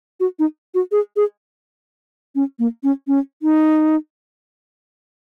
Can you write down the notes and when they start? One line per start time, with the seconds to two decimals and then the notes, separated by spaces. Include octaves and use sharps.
0.20 F#4
0.39 D#4
0.75 F#4
0.92 G#4
1.16 G#4
2.35 C#4
2.59 A#3
2.83 C#4
3.08 C#4
3.42 D#4